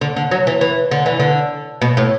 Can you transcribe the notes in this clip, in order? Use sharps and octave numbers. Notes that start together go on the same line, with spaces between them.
D3
D3
F#3
E3
E3
D3
E3
D3
B2
A2